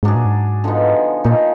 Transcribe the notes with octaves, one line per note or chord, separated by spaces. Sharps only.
G#2 F#3 D4 G#4
A#2
G#2
D3 F3 B3 D#4
A#2 F3 A#3 D#4